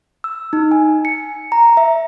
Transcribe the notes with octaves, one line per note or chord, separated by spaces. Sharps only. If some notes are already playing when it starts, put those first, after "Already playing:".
E6
D#4
G#5
C#7
A#5
E5